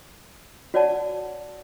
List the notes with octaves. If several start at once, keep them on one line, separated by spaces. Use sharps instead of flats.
F#4 C#5 D5 F#5 A5